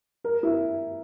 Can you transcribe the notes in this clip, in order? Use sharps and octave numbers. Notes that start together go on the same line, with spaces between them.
A#4
E4